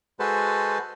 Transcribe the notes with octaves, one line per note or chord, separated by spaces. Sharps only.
G#3 F#4 A4 B4 C5 A5